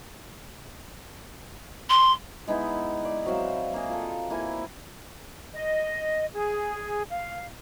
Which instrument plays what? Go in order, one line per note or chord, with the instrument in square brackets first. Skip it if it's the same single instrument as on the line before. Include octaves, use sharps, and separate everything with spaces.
[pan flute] C6
[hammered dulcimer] G#3 B3 D#4 E4
D5
F#3 C4 E5 F5
A#3 G#4
F4 A4
A#3 E4 G#5
[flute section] D#5
G#4
F5